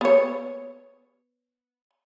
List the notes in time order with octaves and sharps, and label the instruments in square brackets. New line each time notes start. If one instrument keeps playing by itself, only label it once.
[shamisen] B3 C#5